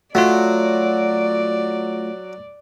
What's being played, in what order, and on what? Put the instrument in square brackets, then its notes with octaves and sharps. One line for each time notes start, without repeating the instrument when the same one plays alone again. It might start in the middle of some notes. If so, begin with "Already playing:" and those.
[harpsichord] F#3 [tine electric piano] A3 F4 [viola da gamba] D5